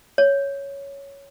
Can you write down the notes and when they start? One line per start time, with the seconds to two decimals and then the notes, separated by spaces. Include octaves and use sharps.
0.18 C#5